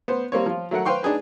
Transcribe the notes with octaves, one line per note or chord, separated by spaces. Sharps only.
B3 C5
G3 A#3 C4 C#5
F3 F4
F#3 A3 A#4 F#5
B4 C5 F5 G5 C6 C#6
D4 D#4 G#4 B4